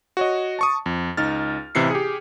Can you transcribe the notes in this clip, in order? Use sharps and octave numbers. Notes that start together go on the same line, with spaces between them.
F#4 C#5 D#5
A5 C#6 D#6
F2
C#2 D#4 F6 A6
A1 C3 E3 E4 C7 C#7
G4 G#4